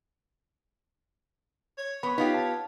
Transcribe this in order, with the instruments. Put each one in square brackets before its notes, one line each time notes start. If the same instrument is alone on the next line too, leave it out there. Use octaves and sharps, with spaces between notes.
[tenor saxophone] C#5
[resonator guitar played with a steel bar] B3 [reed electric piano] B5 C#6
[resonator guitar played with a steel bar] B3 F4 G4 [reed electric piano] D#4
[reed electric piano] A5